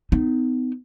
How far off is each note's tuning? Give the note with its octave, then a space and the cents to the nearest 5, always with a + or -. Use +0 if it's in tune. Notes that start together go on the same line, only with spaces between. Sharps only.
B3 +40 D#4 +0